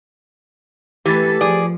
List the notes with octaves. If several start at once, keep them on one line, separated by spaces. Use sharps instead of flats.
E3 A3 G4 A4 B4 A6
F3 G#4 D5